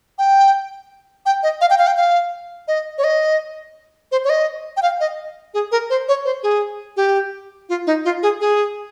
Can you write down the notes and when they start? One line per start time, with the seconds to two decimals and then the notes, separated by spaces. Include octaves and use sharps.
0.18 G5
1.26 G5
1.43 D#5
1.61 F5
1.70 G5
1.79 F5
1.87 G5
1.97 F5
2.68 D#5
2.98 C#5
3.04 D#5
4.12 C5
4.25 C#5
4.29 D#5
4.77 G5
4.82 F5
5.00 D#5
5.54 G#4
5.72 A#4
5.90 C5
6.08 C#5
6.25 C5
6.43 G#4
6.97 G4
7.69 F4
7.87 D#4
8.05 F4
8.23 G#4
8.41 G#4